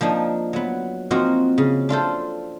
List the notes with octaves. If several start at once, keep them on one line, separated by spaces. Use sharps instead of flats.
F3 A#3 D4 D#4
F#3 B3
F3 A#3 C4 D#4 F4 F#4
C#3
D4 F4 A4 C5